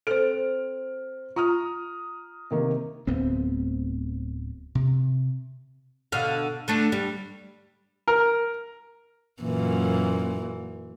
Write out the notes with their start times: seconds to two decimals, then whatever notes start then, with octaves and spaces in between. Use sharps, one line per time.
0.07 C4 A4 C5 F6 D7
1.36 F4 A#5 D#6 F6
2.51 C3 D#3 A#3
3.07 D1 D2 B3 C4
4.75 C3
6.12 B2 D3 F5
6.68 D3 A3 D4
6.92 G3
8.08 A#4
9.42 F#2 A#2 E3